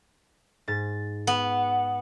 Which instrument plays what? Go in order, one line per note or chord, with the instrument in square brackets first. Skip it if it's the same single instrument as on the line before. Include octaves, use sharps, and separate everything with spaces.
[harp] G#2 A6
[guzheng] B3